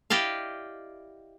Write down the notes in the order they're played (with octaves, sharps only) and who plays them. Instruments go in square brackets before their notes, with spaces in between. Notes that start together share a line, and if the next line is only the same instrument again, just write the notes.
[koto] E4 G4 D5 D#5 F5